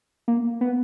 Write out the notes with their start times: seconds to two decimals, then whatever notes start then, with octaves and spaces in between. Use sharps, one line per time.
0.28 A#3
0.61 B3